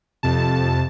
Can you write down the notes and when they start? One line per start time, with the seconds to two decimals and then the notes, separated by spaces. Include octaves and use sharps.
0.23 F2 C3 A5